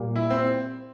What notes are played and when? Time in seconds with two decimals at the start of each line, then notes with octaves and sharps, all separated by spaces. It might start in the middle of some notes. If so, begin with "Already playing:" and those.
Already playing: A#2 G3 A#3
0.16 E4
0.30 C4